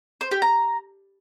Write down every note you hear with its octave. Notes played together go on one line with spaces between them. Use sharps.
C5
G4
A#5